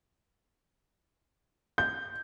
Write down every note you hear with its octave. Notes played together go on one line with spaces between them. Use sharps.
G6